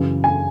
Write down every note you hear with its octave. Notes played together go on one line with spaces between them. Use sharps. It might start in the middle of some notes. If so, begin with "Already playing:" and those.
Already playing: F#2 C#3 E3
G#5